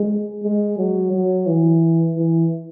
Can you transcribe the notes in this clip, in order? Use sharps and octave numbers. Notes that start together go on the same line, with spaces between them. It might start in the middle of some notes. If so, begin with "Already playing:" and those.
Already playing: G#3
G#3
F#3
F#3
E3
E3